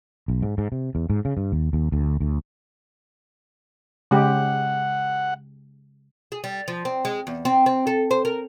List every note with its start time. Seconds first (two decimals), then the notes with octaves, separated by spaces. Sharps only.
0.28 B1
0.42 G#2
0.58 G#2
0.72 C3
0.95 E2
1.10 G#2
1.25 C#3
1.37 G2
1.52 D#2
1.73 D#2
1.92 D2
2.20 D2
4.11 C#3 G#3 G4 F#5
6.32 G#4
6.44 G3
6.68 F3
6.85 C4
7.05 G#3
7.27 E2
7.45 C4
7.66 C4
7.87 A4
8.11 C5
8.25 A#4